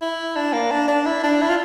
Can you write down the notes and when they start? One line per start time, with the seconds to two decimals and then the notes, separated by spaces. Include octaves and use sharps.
0.02 E4
0.36 D4
0.53 A#3
0.71 D4
0.88 D4
1.06 E4
1.24 D4
1.42 E4
1.49 F4